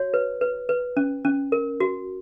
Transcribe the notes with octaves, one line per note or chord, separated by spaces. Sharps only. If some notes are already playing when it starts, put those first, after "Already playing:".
Already playing: F#4 C#5
B4
B4
B4
C#4
C#4
A#4
F#4